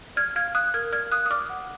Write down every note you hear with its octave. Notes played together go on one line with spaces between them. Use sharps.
D5 F6 G#6
F5 F6 G#6
F5 D#6 F#6
A#4 F6 G#6
D5 F6 G#6
F5 D#6 F#6
D#6
D5 D6 F6
F#5